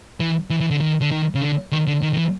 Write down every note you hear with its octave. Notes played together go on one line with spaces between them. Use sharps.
E3
E3
E3
D3
D#3
D3
D#3
C#3
D3
D#3
D3
D#3
D#3
E3